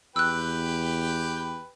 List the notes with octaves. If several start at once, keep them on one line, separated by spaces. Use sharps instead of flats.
E2 G4 B4 G5 E6 F#6